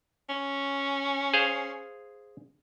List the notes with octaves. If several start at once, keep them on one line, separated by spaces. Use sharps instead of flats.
C#4
G#4 C5 F5